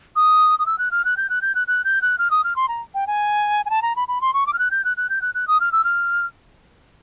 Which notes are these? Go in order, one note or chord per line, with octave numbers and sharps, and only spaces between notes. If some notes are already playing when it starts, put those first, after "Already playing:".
D#6
D#6
E6
F#6
F6
F#6
G6
F#6
G6
F#6
F#6
G6
F#6
F6
D#6
F6
C6
A#5
G5
G#5
G#5
A5
A#5
B5
B5
C6
C#6
D6
F6
F#6
G6
F#6
F#6
G6
F#6
F#6
D#6
F6
E6
F6